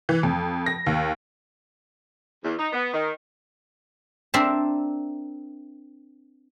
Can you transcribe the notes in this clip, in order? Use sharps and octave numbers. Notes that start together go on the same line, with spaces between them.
E3
F2
A#6
D#2
E2
D#4
B3
D#3
C4 D4 A#4 E5 A5